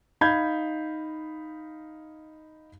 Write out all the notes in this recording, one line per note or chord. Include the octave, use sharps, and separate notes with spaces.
D#4 F5 B5 G6 G#6